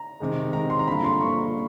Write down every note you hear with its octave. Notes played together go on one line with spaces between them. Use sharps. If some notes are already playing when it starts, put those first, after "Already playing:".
Already playing: A#5
C3 D#3 G#3
C3 D#3 G#3 A#5
C6
A#5
G2 D3 F3 A#3 B5
C6
G2 D3 F3 A#3 C#6